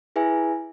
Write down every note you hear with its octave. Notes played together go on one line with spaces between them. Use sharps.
E4 G#4 B4 E5 G#5